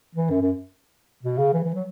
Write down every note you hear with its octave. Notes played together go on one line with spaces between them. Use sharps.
E3
F#2
F#2
B2
C#3
E3
E3
F#3